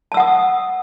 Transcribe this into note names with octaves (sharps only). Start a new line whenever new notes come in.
F#5 A5 D#6 E6